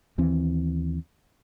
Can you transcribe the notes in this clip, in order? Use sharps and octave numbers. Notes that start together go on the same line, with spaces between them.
D#2 E3 C4